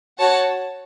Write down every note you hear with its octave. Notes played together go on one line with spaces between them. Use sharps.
F#4 C#5 F#5 A5